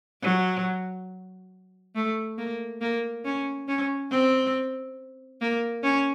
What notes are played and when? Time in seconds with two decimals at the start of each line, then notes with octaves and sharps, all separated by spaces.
0.22 F#3
1.95 A3
2.38 A#3
2.81 A#3
3.25 C#4
3.68 C#4
4.11 C4
5.41 A#3
5.84 C#4